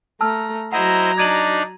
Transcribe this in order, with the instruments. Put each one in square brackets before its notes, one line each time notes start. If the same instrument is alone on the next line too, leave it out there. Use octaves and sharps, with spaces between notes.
[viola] A3 A#5 [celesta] A5 E6 F6
[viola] F#3 A#5 [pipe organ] E4 C5 D#5 [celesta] F#5
[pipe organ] D4 D#4 D5 [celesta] G#6 D#7 F#7